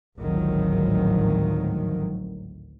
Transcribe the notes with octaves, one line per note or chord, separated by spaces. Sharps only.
G#1 D2 A2 D#3 F3 F#3